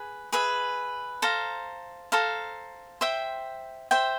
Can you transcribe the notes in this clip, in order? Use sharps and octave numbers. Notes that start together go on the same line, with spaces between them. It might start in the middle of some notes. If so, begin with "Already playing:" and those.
Already playing: G#4 B4
G#4 B4 E5
A4 C5 F5 A#5
A4 C5 F5 A#5
C5 E5 G5
C5 E5 G5